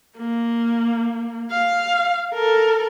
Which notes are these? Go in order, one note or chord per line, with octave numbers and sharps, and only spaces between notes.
A#3
F5
A4 A#4